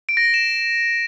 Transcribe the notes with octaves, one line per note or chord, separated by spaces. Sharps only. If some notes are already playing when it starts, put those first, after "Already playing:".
D7
A#6
D7
E7